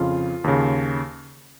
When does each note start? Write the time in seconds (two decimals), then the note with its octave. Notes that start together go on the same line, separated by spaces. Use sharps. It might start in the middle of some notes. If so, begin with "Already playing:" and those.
Already playing: F2 C#3 F4
0.44 D#2 C#3